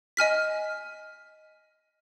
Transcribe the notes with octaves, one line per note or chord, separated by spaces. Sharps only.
D#5 G#5 F6 B6